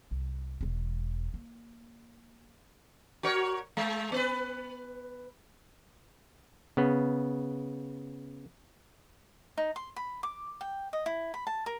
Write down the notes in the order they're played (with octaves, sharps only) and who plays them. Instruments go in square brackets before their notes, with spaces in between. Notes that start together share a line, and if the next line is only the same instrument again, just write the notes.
[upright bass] C2
E1 G#3
A#3
[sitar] F#4 A#4 C#5
G#3
B3 B4
[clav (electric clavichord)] C#3 B3
[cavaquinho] D#4
C6
B5
D6
G5
D#5
E4
B5
A5
A#4